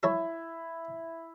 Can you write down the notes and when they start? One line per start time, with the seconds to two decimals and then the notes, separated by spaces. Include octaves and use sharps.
0.03 E4 A4 C#5 A5